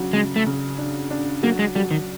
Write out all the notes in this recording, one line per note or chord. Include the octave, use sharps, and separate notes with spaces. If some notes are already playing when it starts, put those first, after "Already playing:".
Already playing: C#3 F#3 D4
C#3 G#3
A3
C#3
D4
D4
F#3 A#3
G#3
F#3 G3
D#3